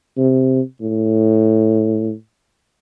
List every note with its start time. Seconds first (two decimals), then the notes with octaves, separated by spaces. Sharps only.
0.17 C3
0.81 A2